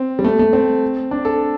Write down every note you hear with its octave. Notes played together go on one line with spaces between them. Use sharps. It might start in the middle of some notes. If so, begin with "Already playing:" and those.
Already playing: C4
G3
A3
A3
C4
D4
A4